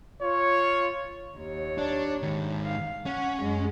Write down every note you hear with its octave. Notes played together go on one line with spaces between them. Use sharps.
F4 C#5
D#2 C#5
D4
G#2 D#3
F5
C#4 F#5
F#2 G#3